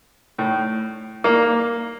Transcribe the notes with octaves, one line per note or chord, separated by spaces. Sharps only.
A2
A#3